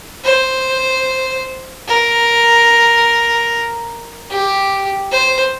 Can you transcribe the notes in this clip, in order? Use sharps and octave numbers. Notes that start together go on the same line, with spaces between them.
C5
A#4
G4
C5